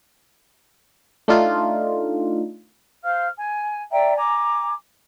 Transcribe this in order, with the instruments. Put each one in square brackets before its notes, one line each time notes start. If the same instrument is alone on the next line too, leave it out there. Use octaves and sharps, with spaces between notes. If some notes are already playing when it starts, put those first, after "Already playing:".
[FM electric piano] A3 D4 D#4 F4
[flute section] C5 F5 F6
G#5
D5 E5 G5 A#5
G#5 A#5 D6